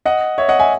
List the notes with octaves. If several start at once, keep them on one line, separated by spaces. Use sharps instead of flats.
D#5 F#5
C#5 E5
D#5 F#5
E5 G#5